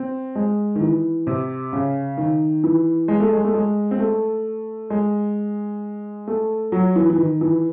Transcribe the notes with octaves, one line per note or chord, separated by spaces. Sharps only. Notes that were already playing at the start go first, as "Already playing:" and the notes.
Already playing: C4
G#3
D#3
E3
C3
C#3
D#3
E3
G#3
A3
G#3
A3
G#3
C4
A3
G#3
A3
F#3
E3
E3
D#3
E3